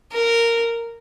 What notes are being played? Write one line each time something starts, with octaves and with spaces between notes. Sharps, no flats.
A#4